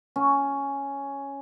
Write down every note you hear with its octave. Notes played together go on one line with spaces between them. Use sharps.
C#4